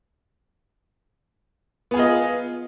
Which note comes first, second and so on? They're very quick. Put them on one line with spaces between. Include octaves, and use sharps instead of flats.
B3 G#4 F4 D#5